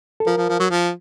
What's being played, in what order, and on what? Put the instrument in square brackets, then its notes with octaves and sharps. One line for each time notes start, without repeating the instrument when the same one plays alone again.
[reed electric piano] A4
[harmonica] F3 [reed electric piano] A#4
[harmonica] F3
F3
F#3
F3